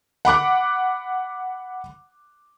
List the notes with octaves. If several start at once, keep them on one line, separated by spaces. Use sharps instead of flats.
F#5 B5 D6 F#6